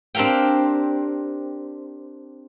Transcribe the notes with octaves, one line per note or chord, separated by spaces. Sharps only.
C4 D4 G4 A#4 F5 G5